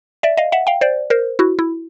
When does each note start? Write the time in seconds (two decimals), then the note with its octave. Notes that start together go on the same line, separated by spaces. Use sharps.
0.23 D5 E5
0.37 D#5 F5
0.52 E5 F#5
0.67 F5 G5
0.81 C5 D5
1.10 A#4 C5
1.39 E4 F#4
1.59 E4